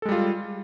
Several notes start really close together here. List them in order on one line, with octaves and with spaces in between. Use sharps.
A4 G#3 G3 F4